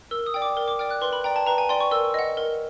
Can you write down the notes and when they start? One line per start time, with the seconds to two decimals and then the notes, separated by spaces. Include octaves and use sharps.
0.11 A#4 E6
0.26 D#6
0.34 D5 G5
0.42 D6
0.57 A#4
0.68 D6
0.79 D5 G5 F6
0.90 F#6
1.01 B4 C6
1.13 B5
1.24 D5 G5 A#5
1.36 A5
1.47 B4 A#5
1.58 G#5
1.69 D5 G5 C6
1.80 C#6
1.91 A#4 E6
2.14 D#5 F#5
2.37 A#4